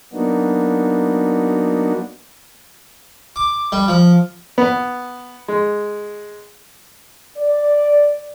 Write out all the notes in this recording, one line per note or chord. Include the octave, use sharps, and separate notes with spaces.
F#3 A#3 B3 D4 D#4 F#4
D6
G3
F3
B3
G#3
D5